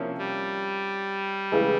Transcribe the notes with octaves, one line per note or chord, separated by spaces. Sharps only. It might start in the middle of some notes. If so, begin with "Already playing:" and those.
Already playing: C3 F3 A#3 C#4 E4
G3
C#3 E3 G#3